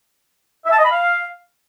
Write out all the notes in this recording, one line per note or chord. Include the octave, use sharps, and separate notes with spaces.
E5
A5
D#5
B5
F5